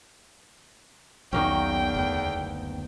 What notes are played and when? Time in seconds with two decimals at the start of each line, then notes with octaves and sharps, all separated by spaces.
1.33 B1 E2 D#3 A#3 C#4 G5
1.94 F#1 D2 B3